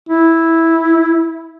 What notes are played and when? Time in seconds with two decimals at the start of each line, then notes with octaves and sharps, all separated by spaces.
0.09 E4